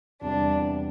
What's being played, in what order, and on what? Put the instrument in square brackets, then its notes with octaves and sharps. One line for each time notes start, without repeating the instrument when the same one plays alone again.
[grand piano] E2 C3 G3 [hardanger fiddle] D4